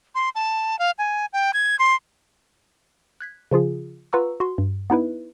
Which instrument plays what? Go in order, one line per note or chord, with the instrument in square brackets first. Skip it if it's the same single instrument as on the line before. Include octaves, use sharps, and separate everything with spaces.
[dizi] C6
A5
F5
G#5
G5
G#6
C6
[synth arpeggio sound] F#6 G#6 B6
C#3 F3 F4 G#4
F4 B4 F#5 A#5 C#6 E6
F#4 C6
G2
B3 D#4 E4 B4